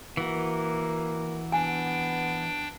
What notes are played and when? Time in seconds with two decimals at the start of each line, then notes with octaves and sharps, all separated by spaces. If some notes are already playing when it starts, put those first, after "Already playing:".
0.17 E3 A#3 F#4
1.52 B3 D4 G5 G#5